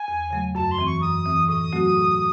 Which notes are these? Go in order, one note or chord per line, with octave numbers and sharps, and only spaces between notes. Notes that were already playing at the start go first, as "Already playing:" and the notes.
Already playing: G#5
E2
C#3 F#3 A3
F#2 A5
C6
E3 C4
C#6
F#2 D#6
E3 C4
A2 D#6
F#3 A3 C4 F#4
A2